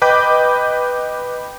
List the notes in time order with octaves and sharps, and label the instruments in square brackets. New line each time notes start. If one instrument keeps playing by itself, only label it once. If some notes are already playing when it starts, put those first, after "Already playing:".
[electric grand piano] B4 D#5 G5 B5 D6 G6